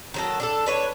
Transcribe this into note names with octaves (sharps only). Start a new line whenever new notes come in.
D#3 F#3 A4
D4 G#4 A4
D4 B4 C#5